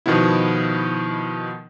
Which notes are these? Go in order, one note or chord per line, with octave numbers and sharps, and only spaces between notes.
B2 D#3 F3 B3 E4